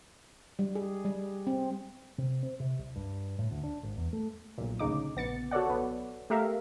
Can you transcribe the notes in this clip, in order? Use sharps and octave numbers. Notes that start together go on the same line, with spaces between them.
G3
G#4
G3
C4
C3
C4
C3
C2
G2
A2
D2
D4
G#1
E2
A3
B1 A#2
D2 C#3 D#4 D6
A#1 B3 A6 C#7
F#4 A4 C#5 D5 F#5
B1 B3
A3 G4 A#4 E5 F5